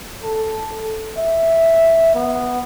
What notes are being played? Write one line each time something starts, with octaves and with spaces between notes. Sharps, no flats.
A4
E5
B3